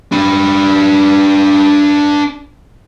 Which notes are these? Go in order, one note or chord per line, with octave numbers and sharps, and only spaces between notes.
D4 B4